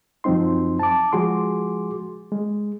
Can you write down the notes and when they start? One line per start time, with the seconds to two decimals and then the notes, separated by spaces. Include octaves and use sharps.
0.24 F#2 F3 F#3 C4 D#4 C6
0.79 A5 D6
1.12 F3 G#3 F#4 G#4 C6 D6
2.32 G#3